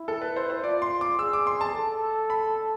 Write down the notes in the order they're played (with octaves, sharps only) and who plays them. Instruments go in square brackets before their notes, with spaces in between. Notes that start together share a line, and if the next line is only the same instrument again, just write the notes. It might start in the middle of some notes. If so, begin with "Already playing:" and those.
Already playing: [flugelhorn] E4
[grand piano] A4
B4
C5
C5
[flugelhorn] F4 [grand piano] D5
[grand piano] C6
D6
[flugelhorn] G#4 [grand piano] E6
[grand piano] D6
C6
A5
[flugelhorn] A4
[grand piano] B5